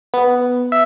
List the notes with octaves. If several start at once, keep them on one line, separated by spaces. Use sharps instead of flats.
B3
E5